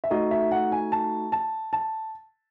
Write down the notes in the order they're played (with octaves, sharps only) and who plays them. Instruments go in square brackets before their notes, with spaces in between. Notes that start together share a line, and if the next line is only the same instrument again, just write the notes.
[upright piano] E5
[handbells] A3 D#4 F#4 A4 [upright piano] D#5
[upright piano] E5
F#5
G#5
A5
A5
A5